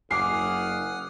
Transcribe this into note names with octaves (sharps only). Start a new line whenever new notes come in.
F#1 F#5 G#5 D6 D#6 F6 C7